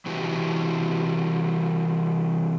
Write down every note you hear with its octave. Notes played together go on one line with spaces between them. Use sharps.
C3 E3 E4 F#4 G4